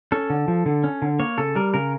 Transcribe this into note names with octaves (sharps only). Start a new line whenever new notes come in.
C#4 A4
D3
F3
D3
C#4
D3
A#3 C#5
C#3 A4
G3 A#4
C#3 A#4